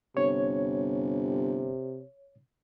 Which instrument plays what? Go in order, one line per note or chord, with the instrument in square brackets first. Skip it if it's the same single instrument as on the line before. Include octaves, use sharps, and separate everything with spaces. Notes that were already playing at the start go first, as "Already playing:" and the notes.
[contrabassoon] G1 [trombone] C3 [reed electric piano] C#5